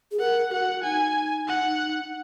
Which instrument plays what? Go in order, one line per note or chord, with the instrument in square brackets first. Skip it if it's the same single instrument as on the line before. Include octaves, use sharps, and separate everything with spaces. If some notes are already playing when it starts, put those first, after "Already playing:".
[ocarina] G#4
[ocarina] A#4 [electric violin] F#5
[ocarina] F#4 [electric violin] F#5
[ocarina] D#4 [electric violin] G#5
[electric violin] F#5